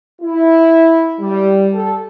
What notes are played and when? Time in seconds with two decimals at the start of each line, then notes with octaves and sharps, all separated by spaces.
0.21 E4
1.20 G3
1.73 A4